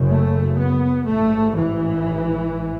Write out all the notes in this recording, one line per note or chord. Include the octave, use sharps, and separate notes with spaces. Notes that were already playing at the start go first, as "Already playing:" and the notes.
Already playing: F#1 F#2 C#3
A3
B3
A1 G#2 A3
E3